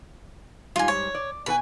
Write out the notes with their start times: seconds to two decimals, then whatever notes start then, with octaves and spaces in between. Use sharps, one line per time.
0.76 G#2 G3 F4 G#5
0.88 C#5
1.15 D5
1.46 B2 A4 B4 G#5